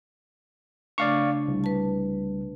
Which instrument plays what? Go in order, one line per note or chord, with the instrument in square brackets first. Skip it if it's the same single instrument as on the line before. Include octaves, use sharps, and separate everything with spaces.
[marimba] C#3 A3 D4 [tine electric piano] D5 F5 C#6
[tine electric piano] C2
[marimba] B4 A5